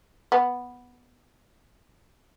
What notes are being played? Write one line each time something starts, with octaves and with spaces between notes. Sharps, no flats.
B3